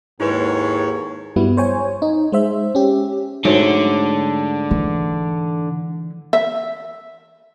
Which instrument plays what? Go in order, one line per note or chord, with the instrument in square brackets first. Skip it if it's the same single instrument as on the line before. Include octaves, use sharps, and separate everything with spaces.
[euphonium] D#2 [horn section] G#2 [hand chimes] E4 B4 [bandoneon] C#5
[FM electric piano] G2 F#3 G3 B3 E4
C5 C#5 G#5
D#4
G#3 C5 E5
C#4 G4
[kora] G#2 F#3 A3 [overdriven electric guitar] D3
[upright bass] E3
[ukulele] E5